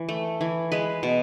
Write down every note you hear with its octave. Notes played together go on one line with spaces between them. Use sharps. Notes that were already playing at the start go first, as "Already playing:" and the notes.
Already playing: E3
A3
E3
G#3 B4
B2